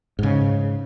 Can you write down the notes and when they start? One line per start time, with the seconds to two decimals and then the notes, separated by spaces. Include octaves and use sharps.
0.19 G#2 C#3